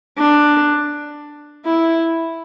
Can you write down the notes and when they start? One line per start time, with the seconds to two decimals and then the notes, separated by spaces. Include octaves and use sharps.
0.18 D4
1.65 E4